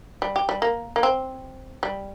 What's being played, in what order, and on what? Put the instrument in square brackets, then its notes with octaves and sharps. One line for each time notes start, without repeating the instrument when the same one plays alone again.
[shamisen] G3
G4
G3
A#3
A#3
C4
G3